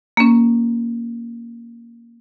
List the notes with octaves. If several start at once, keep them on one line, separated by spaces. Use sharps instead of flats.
A#3 C#4